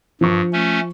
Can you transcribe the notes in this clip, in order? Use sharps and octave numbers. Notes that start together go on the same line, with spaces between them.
G2 F3 C#6
A3 C#4